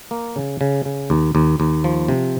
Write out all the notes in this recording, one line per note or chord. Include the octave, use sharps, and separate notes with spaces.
A#3
C#3
C#3
C#3
D#2
D#2
D#2
F3
C3